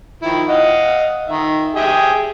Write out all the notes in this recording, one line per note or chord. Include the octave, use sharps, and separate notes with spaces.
D#3 F3 E4
D#5 F5 F#5
D#3 E5
G4 G#4 E5